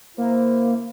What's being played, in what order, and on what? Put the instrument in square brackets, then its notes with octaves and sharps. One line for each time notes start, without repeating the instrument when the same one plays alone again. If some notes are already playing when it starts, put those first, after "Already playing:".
[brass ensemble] C#3 E4 C5 [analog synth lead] A#3